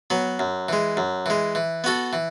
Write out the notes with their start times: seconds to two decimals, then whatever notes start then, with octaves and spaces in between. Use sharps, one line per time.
0.10 F#3 B3
0.39 F#2
0.69 E3 G#3
0.97 F#2
1.26 E3 G#3
1.55 E3
1.84 B3 F#4 A4
2.13 E3